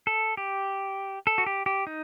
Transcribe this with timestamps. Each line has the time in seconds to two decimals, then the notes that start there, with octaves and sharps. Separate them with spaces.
0.07 A4
0.37 G4
1.27 A4
1.38 F#4
1.46 G4
1.66 G4
1.87 D#4